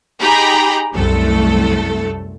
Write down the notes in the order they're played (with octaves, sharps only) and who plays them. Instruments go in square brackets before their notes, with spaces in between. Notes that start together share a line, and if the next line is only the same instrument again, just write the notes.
[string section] D#4 G4 G#4 G5 A#5 B5
C2 F#2 A3 A4